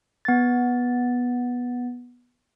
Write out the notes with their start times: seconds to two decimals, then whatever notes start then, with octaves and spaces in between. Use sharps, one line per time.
0.25 B3 A6